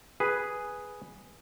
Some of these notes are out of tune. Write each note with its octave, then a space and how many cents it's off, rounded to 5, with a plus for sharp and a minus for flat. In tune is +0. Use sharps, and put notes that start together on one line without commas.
G#4 +0 B4 +0